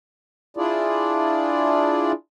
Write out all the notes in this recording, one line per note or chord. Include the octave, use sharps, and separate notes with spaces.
D4 E4 F4 G#4 D5